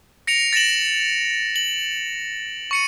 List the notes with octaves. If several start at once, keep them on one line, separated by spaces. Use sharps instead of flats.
A#6 C#7 D7 F7
A6 A#6 D7 E7 F#7
F#7
C#6 C#7 D#7